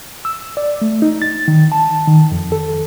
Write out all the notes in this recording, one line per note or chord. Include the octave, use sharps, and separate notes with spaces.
E6
D5
A3
D#4
A6
D#3
A5
D#3
F2
A4